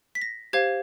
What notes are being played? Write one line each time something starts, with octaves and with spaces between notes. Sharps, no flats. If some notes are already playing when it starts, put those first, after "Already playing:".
B6
A#6
G4 C5 F5 G#6